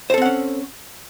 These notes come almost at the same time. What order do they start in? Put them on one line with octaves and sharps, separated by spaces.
C5 A4 C4 F#5 C#4